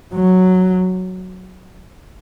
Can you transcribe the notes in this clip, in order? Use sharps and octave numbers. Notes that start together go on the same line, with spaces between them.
F#3